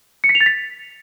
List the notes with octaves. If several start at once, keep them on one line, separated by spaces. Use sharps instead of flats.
C#7
B6
F7
A6
B6